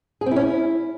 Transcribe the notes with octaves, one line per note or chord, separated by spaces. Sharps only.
G#4
C4
E4
C#4
E4